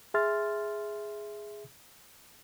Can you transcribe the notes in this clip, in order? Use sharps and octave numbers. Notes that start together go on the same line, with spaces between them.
G#4 E5 C6 F6 A6